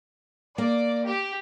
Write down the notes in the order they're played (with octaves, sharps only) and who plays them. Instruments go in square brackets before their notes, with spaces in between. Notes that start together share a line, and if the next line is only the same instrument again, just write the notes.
[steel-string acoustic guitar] A#3 [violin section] D5
[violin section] G4